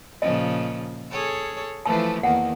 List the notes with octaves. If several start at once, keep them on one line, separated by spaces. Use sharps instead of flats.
A#2 C#3 F3 D#5
G#4 A4 C#5
E3 F3 A3 A5
E2 D#3 A#3 F#5